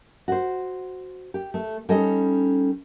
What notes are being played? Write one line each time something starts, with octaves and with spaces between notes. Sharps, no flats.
F#4 C5
G4
A3
G3 C#4 D#4 A4 D#5